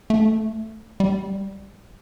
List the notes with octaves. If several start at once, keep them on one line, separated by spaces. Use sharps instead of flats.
A3
G3